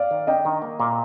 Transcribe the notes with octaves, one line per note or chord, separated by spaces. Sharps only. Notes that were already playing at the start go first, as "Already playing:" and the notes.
Already playing: D5 F5
D#3
D4 D#5 G5
D#3
A#3
A#2